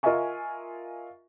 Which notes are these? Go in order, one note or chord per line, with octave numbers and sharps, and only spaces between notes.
F4 A#4 D#5 E5 G#5 C#6